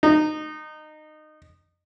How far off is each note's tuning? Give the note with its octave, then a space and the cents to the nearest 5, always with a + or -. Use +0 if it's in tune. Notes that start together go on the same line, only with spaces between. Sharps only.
D#4 -20